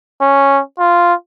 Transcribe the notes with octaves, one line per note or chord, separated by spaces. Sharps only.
C#4
F4